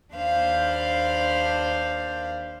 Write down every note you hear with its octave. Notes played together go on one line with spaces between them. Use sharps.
D#2 D4 C5 F5 B5